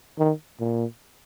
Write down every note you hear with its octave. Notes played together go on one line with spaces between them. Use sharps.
D#3
A#2